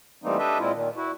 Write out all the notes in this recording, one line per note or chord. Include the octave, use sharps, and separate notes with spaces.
E3 G3 A3 A#3 C4 D#4
D4 G4 A4 B4 D#5 E5
A#2 G#3 C4 E4 F4
A#2 D#3
E4 F#4